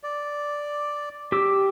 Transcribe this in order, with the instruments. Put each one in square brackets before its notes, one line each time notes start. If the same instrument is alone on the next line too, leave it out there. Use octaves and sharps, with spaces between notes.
[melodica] D5
[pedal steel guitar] G4 D6 E6